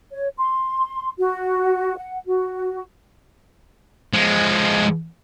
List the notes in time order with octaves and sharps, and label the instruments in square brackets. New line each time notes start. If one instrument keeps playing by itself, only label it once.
[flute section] C#5
C6
F#4
F#5
F#4
[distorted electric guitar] F3 G#3